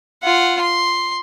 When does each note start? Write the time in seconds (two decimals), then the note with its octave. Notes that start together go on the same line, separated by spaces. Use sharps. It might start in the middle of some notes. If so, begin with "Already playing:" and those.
0.24 F4 F#5
0.62 C6